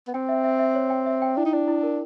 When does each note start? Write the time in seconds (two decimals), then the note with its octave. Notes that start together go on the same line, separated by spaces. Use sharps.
0.08 B3
0.14 C4 G5
0.29 E5
0.44 E5
0.59 E5
0.75 C#5
0.90 G5
1.06 E5
1.22 G5
1.37 D4 E4
1.45 D#4
1.53 D4 E4
1.68 E4
1.83 A#4